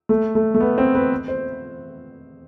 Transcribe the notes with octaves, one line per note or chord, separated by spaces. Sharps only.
A3
A3
A3
B3
C4
B4
C5